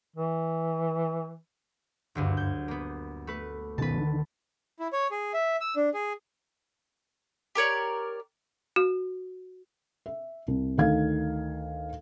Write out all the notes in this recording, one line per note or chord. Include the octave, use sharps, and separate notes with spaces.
E3
F#1 D2 G2
G6 G#6
A#3 B3
A3 B4
B2 D#3 B3 B4 A5
D3 D#3
E4
C#5
G#4
E5
E6
D4
G#4
G4 A#4 C#5 D5
F#4
E5
C2
D2 D#3 F5 G#6